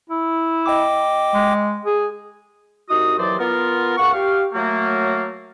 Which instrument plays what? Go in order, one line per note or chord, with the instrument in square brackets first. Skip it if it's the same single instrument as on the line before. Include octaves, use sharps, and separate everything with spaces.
[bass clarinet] E4
[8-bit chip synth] D#5 G5 D6
[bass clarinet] G#3
G#4
[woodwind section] C2 D#4 F#4 D#6
D#2 E3 F#3 C5 D5
B3 F4 A#4
C#2 A#3 F#5 C#6
G4 F5
F#3 A3 A#3